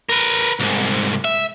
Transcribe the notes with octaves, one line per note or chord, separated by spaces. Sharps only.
A#4 B4
C2 G#2
E5